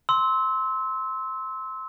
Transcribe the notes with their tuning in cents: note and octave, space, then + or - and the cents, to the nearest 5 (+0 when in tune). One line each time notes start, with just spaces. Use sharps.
C6 +0 E6 -25